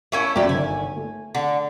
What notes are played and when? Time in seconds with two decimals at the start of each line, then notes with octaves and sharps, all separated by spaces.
0.12 A3 C#4 E4 A#4 F5 C#6
0.36 F#2 F#3 G4 D5 E5
0.49 G1 D#3 G#5
0.96 A3
1.35 D3